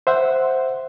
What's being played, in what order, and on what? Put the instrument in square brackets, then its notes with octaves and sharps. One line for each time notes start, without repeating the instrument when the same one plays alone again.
[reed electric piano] C5 E5 F#5